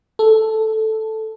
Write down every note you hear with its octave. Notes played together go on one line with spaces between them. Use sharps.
A4